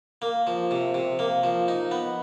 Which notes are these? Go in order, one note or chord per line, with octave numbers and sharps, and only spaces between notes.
A#3
F3
C3
C3
A#3
F3
D#4
B3